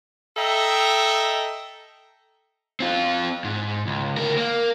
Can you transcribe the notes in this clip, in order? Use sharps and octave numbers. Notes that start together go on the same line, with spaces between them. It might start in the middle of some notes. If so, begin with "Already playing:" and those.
A4 D#5 E5 G5 A#5
C4 F4
G#2
C#2
D2 A#4
A#3 A#4